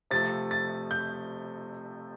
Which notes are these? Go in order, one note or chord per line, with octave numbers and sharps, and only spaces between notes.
C3 F3 A3 A6
A6
G6